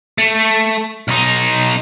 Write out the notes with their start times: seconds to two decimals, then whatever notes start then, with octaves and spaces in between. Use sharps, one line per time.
0.18 A3
1.08 B1 D#4